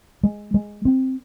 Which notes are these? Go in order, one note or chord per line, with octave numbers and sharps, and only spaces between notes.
G#3
G#3
C4